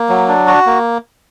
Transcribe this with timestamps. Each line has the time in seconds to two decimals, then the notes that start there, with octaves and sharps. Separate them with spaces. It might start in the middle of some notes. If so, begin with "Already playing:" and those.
Already playing: A#3
0.09 F#3
0.28 D4
0.47 F#4
0.66 A#3